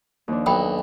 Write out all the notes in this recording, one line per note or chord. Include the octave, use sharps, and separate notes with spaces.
D#2 F3 D4
B1 F#3 G5 B5 D#6